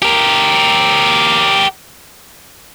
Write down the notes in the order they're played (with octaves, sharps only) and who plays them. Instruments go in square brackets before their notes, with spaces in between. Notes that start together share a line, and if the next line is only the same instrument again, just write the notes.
[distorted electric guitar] G4 A#4